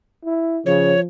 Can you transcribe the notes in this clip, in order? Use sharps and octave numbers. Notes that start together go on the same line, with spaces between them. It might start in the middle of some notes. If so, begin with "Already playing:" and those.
E4
C#3 F3 C#5